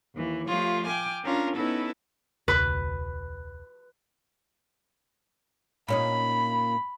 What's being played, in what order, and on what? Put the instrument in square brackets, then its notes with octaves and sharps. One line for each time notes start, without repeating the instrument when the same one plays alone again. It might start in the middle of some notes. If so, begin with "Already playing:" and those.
[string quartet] D#2 E3
F3 A3 F4 G4 C#5
G5 G#5 D6 F6
C#4 D4 F4 A#4
B3 C#4 D#4 E4 A4 B4
[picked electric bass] E1 C#2 [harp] B4
[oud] A#2 C#4 D#4 [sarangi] B5